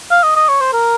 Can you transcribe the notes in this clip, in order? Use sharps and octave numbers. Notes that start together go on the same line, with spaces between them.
F5
D#5
D#5
C#5
C5
A#4